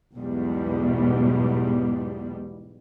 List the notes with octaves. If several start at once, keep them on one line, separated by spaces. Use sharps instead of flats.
B1 E2 G#2 B2 G3